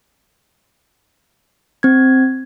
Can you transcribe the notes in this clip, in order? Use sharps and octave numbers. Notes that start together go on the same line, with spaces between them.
C4 G#6